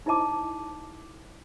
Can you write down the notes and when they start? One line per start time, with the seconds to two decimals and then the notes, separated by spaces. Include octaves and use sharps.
0.06 D#4 E4 C5 D#5 A5 D6